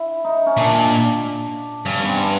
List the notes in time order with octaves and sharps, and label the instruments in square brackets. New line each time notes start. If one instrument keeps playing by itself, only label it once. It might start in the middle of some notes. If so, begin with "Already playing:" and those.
Already playing: [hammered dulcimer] E4
D#4
C#4
[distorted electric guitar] A#2 [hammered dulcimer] D4
[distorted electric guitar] G2 [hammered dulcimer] C#4
[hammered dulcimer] B3
C4
B3